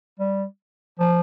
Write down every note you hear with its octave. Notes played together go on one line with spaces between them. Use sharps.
G3
F3